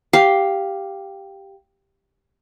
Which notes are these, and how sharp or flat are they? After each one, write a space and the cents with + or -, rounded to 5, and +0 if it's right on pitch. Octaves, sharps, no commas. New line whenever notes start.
G4 +0 F5 +0